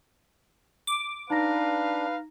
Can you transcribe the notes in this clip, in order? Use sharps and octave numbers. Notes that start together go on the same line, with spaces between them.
D6
D4 D#4 B4 F5 A#5 A#6